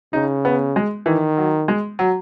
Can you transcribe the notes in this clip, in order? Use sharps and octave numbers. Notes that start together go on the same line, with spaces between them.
C#3 D#4
B3
G#3
D#3 E3
F#3
G#3
F#3